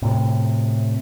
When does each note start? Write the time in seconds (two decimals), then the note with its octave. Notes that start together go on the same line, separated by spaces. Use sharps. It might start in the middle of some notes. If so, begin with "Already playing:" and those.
0.02 A2 C3